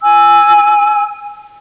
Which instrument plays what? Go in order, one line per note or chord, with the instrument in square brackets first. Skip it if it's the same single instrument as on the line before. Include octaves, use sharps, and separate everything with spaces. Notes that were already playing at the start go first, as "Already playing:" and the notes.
[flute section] G#5 E6